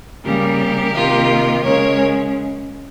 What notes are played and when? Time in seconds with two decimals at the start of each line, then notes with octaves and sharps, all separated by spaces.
0.24 C#3 G3 A#3 G4 A#4
0.95 C3 D#3 A#3 F4
1.64 C#3 G#3 C#4 A#4 C#5